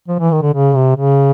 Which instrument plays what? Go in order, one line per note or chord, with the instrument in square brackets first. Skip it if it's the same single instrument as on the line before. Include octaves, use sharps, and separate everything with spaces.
[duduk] F3
E3
D#3
D3
C#3
C3
C#3